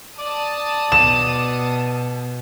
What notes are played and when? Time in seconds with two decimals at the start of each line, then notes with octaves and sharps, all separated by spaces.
0.19 D5 A5 D#6
0.92 B2 E7